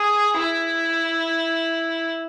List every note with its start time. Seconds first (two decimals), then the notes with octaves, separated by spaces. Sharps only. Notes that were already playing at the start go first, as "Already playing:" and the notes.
Already playing: G#4
0.39 E4